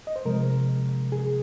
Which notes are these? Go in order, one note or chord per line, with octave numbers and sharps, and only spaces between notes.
D#5
C5
C3 F3 G#3 A#4
G#4